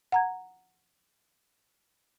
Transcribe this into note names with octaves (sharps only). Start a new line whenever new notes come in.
F#5 A#5 G#6